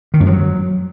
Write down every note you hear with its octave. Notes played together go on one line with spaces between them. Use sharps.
D#3
F#2
F3
F#3